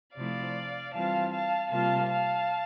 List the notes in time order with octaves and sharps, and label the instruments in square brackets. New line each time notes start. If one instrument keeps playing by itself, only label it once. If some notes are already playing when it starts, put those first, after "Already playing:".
[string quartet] C3 F3 A3 E4 D5 F5
E3 G3 C4 F4 F5 A5
F5 A5
C3 G3 A#3 F4 F5 A5
F5 A5